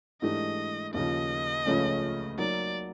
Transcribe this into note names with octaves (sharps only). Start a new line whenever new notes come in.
G#2 E3 A3 D4 G4 D#5
D#2 C#3 F3 D#5
C#2 C#3 F3 A3 C#4
F#3 A#3 D#4 D5